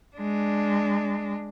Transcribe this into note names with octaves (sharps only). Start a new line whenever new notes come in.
G#3 D4